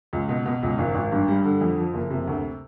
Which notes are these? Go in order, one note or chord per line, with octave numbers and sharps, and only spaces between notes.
C#2
B2
B2
C#2
G#1
G#1
G2
G3
D3
F2
F3
F#1
C3
D2